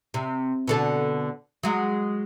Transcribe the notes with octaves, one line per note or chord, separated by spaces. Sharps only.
C3
B2 D3 A4
F#3 G#3